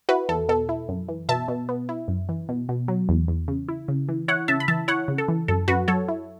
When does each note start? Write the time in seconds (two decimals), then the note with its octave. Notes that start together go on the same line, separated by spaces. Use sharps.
0.09 E4 F#4 B4
0.29 E2 A4
0.49 B2 A4
0.69 E4
0.89 F#2
1.08 E3
1.29 B2 E5 A5
1.48 B2
1.69 B3
1.89 E4
2.08 F#2
2.29 E3
2.49 B2
2.69 B2
2.88 F#3
3.09 E2
3.28 E2
3.48 C#3
3.68 E4
3.88 C#3
4.08 E3
4.28 E4 C#5 F#5
4.48 C#3 E5 A5
4.60 B5
4.68 E3 E5 A5
4.88 E4 C#5 F#5
5.08 C#3
5.18 A4
5.28 E3
5.48 F#2 A4
5.68 F#2 F#4 B4
5.88 F#3 A4 C#5
6.08 E4